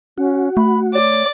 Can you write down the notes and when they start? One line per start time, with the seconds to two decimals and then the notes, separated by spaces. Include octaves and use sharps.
0.18 C#4 F#4
0.57 A3 B5
0.94 C#5 D5